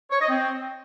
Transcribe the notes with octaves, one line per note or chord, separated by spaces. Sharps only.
C#5
D#5
C4